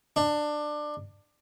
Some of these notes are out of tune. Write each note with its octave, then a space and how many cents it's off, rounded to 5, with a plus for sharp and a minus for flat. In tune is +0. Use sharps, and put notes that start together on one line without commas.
D4 +20